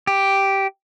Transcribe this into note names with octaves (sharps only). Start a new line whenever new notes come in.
G4